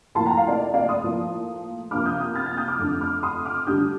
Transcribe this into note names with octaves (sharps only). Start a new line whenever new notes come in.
A2 F3 A#3 A5 C6
G5 A#5
F5 A5
D5
D#5
D5 F5
C6 D#6
A2 F3 A#3
C3 F3 A#3 D4 D6 F6
D#6 G6
D#6 G6
F6 A6
F6 A6
D#6 G6
D6 F6
F2 D3 A3 D4
D6 F6
C6 D#6
D6 F6
D3 G3 D4 D#6 G6